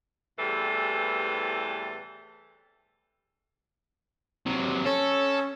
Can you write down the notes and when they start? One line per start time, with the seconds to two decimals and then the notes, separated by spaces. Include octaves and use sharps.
0.39 E2 A2 C3 E3 G3 A4
4.46 C3 F#3
4.86 C#4 A4